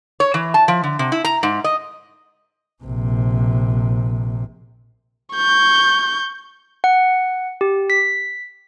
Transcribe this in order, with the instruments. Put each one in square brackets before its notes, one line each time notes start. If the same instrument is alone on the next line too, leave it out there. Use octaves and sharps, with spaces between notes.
[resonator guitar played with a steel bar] C#5
E3
A5
F3
D3
C3
E4
A#5
G#2
D#5
[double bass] A#1 C3
[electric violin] C#6 G6
[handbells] F#5
G4
B6